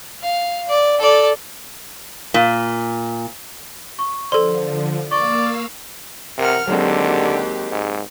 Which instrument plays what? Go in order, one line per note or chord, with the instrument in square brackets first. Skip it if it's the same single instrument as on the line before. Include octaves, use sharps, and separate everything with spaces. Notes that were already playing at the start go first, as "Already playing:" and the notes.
[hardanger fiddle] F5
D5
A4 D5
[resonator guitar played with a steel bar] A#2
[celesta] C#6
[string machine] D3 F3 [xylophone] A4 C6 [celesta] C5 D5
[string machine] A#3 F5 E6 [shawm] D5 [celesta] C#6
[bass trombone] C3 [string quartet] A#4 F#5 F6
[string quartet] D#2 G4 [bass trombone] D3 [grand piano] F#3 G#3 C4
[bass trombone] G#2